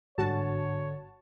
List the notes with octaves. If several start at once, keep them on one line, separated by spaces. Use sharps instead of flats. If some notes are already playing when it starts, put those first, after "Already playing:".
G1 G#2 D3 F#4 C#5 A5